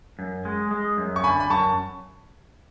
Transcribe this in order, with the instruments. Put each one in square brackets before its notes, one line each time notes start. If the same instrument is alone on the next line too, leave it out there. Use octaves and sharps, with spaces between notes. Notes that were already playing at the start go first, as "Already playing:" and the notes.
[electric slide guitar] F#2
G#3
G#3
F#2
[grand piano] C#6
[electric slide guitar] D3 [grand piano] G#5 B5
[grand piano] B5
[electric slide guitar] F#2 [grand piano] A5 C#6